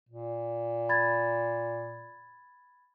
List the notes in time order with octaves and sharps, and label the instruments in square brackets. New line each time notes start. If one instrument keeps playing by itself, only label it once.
[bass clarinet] A#2
[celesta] B5 G#6 A6